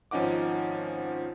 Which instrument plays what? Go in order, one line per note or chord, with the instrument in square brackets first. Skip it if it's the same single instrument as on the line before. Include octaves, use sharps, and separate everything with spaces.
[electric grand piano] G#1 F3 C#4 D#4 F#5 D6